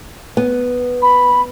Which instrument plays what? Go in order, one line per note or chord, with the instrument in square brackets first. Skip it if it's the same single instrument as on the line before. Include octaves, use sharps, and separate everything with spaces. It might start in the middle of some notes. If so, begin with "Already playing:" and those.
[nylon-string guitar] B3
[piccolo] B5